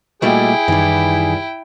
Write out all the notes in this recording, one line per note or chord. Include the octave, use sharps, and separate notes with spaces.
A#2 G3 A3 E4 F#4 G#4 D#5 G5
F#2 D#3 E3 G3 D#4